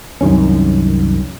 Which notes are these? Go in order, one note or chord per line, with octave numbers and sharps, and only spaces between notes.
C2 F#2 D#3 C#4